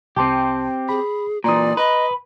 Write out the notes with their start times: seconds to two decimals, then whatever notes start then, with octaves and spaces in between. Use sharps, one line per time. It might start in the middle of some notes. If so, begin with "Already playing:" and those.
0.17 C2 C4 G4 A5 C6
0.89 G#4 B5
1.44 A#2 E3 D5 A#5 C6 D#6
1.77 B4 D#5